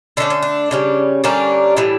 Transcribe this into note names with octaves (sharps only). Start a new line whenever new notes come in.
D3 A3 C#4 D4
C#4
D4
C#3 G3 C#4
D3 G3 A#3 C#4 D4
A2 E3 G3